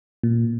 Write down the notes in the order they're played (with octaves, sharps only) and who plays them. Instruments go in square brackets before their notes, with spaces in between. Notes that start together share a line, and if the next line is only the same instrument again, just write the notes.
[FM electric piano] A#2